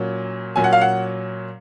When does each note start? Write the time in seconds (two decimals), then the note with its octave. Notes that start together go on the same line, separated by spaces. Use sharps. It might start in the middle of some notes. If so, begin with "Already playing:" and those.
Already playing: A#2 F#3 C#4
0.56 A#2 F#3 C#4 G#5
0.64 F#5
0.73 F5
0.81 F#5